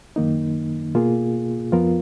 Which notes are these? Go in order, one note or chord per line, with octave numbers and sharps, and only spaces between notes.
F#2 D#3 A#3 D#4
B2 A#3 F4 G#4
F2 F3 B3 F4 A#4